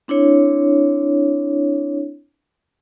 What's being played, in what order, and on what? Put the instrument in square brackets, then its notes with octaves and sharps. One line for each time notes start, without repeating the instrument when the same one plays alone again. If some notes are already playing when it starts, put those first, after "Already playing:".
[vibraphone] C4 D4 E4 C#5